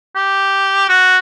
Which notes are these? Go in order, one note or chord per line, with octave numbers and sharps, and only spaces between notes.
G4
F#4